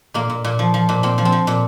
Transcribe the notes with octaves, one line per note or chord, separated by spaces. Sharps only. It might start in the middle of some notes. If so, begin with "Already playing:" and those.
A#2 A#3
A#2
A#2
F3
F3
A#2
A#2 C4
F3
C4
F3
A#2